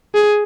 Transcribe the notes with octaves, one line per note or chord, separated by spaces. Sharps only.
G#4